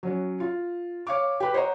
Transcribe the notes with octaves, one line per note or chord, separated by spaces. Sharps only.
F#3 C#4 F#4
F4
C#5 F5 D6
G4 B4
C5 C#5 D#5 F#5 A#5